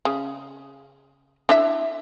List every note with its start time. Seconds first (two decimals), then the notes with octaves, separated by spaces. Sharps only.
0.05 C#3
1.49 D4 E4 E5